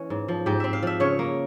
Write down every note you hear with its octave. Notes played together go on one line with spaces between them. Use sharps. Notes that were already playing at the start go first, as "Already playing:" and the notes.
Already playing: E3 A#3 C#4
G#2
F3
G#2 G4
C4 E5
F5
F3 E5
C#3 C#5
A#3